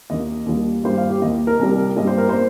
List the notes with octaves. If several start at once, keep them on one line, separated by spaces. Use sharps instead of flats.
D#2 D#3 A#3 D#5
D#2 D#3 G3 A#3
G2 G3 A#3 C5
F5
G4
D#2 D#3 A#3 D#5
A#4
C2 C3 G3
G2 G3 A#3 D#5
C5
A#4
A#3 C5